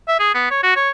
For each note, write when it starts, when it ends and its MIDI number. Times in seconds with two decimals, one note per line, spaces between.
0.08 0.17 76
0.19 0.34 68
0.34 0.50 59
0.51 0.61 73
0.63 0.75 66
0.76 0.90 73